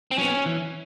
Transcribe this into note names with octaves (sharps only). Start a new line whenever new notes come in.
C4
F#3 B3 C#4
E3